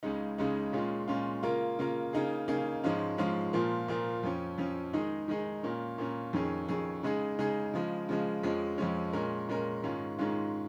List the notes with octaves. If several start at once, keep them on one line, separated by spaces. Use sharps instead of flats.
C#2 C#3 G#3 D#4
C#2 C#3 G#3 D#4
A#2 G#3 C#4 F4
A#2 G#3 C#4 F4
C#3 A#3 F4 A#4
C#3 A#3 F4 A#4
C#3 A#3 D#4 G#4
C#3 A#3 D#4 G#4
G#2 F3 G#3 C#4 F4
G#2 F3 G#3 C#4 F4
A#2 F3 A#3 F4
A#2 F3 A#3 F4
F2 F3 C#4
F2 F3 C#4
D#3 G#3 D#4 G#4
D#3 G#3 D#4 G#4
A#2 A#3 C#4
A#2 A#3 C#4
F2 D#3 C#4 G#4
F2 D#3 C#4 G#4
C#3 G#3 D#4 G#4
C#3 G#3 D#4 G#4
C#3 F3 G#3
C#3 F3 G#3
F2 F3 G#3 C#4
F2 F3 G#3 C#4
A#2 G#3 C#4 A#4
A#2 G#3 C#4 A#4
G#2 D#3 G#3 C#4 F4
G#2 D#3 G#3 C#4 F4